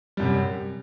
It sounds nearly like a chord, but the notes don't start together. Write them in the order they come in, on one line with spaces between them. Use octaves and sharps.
G3 F#2 C3